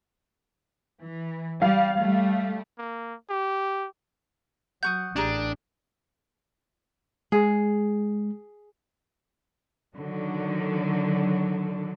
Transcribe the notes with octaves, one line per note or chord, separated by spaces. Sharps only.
E3
G3 F5
G3 A3
A#3
G4
F#3 F#5 C#6 D#6 G6
A1 D4 G4 G#4 A#4
G#3 G#4
D3 D#3 F#3